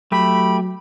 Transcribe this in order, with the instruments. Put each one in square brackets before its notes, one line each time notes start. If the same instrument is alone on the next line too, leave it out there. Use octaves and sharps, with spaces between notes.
[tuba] F#3 [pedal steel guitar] A3 G4 [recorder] B5